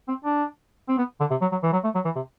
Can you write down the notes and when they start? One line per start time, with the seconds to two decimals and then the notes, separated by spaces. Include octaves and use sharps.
0.08 C4
0.25 D4
0.89 C4
0.98 B3
1.20 D3
1.31 C3
1.41 F#3
1.52 F#3
1.63 E3
1.73 F#3
1.84 A3
1.95 F#3
2.05 E3
2.16 C3